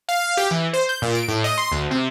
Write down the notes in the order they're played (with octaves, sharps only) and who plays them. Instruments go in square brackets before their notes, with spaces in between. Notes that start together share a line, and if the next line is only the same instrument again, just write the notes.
[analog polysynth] F5
G4
E3
C5
G6
A#2
D7
A2
D#5
C6
D2
C3